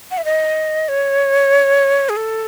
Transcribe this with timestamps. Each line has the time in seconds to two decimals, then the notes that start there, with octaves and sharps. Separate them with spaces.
0.11 F#5
0.18 E5
0.25 D#5
0.88 C#5
2.09 G#4
2.17 A4